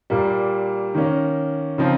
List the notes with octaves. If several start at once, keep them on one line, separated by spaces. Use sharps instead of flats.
A#2 G3 A#3
D#3 A#3 C#4
C#3 F3 C4 D#4